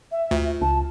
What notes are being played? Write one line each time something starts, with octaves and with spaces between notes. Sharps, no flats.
E5
D2 F4
C#2 A5